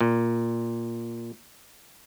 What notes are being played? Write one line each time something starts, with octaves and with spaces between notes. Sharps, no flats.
A#2